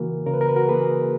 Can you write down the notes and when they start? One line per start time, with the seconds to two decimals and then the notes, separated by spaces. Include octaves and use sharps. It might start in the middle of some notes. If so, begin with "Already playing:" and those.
Already playing: C#3 E3 A#3 F#4 A#4
0.26 C#3 A#4
0.34 B4
0.41 A#4
0.49 B4
0.56 F#4 A#4
0.68 E3 A#3 G#4 B4